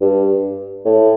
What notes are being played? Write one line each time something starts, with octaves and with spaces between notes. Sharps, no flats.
G2
A2